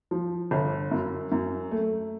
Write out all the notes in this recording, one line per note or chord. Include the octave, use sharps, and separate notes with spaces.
F3
G1
F#2
F#2
A3